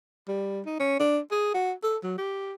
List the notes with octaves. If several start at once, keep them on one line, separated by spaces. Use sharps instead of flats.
G3
D#4
C#4
D4
G#4
F#4
A4
F#3
G4